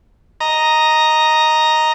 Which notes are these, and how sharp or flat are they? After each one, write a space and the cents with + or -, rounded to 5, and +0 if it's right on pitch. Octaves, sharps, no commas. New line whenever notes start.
D#5 +0 A#5 +0